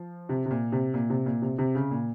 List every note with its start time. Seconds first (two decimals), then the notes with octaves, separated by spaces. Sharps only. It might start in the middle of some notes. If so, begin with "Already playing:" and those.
Already playing: F3
0.29 C3
0.46 C3
0.51 A#2
0.72 C3
0.94 A#2
1.10 C3
1.26 A#2
1.42 C3
1.59 C3
1.75 C#3
1.91 A#2